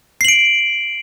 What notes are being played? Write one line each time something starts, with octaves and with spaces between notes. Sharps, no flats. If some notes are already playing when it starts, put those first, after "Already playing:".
C7 D7 F#7